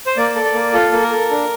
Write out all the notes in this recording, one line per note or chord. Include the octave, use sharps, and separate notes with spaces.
C5
A#3 D5
A4
D5
A#3
F4 A4
A#3
A#4
A4
D4